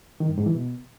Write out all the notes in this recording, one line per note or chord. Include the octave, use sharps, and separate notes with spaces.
D#3
G2
G#2
E3
B2